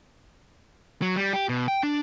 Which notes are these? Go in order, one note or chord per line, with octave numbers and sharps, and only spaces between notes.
F#3
G3
G4
B2
G5
D4